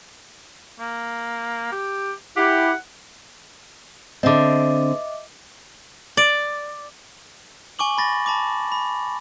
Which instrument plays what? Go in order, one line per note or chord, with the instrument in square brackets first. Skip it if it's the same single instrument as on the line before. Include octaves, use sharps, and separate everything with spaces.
[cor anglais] A#3
G4
[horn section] E4 G4 [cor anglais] F#5
[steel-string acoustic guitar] D3 C4 [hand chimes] D#5 E5 D6
[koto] D5
[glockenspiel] G#5 C#6 D6 F#7
B5 A6 A#6
A5 B5 D6
B5